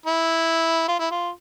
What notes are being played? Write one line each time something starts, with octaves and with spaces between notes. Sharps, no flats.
E4
F4
E4
F4